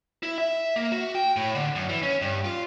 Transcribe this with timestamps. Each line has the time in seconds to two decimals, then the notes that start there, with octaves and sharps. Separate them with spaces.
0.23 E4
0.38 E5
0.76 A#3
0.92 F#4
1.15 G5
1.36 A2
1.55 D3
1.75 F#2
1.89 E3
2.03 C#4
2.22 G2
2.45 F4